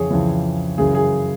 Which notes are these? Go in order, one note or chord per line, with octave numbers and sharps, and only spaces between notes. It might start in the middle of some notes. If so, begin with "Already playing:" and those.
Already playing: F2 C#3 E3 G#4 C#5
F2 C#3 E3
F#2 C#3 E3 G#4
G#4